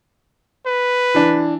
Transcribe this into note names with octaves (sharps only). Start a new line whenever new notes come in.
B4
E3 D4